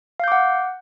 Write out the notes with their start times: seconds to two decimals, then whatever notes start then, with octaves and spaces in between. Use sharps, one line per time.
0.20 F5
0.24 G6
0.28 D6
0.32 F#5